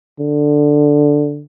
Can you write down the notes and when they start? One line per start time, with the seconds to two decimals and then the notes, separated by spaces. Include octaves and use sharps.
0.20 D3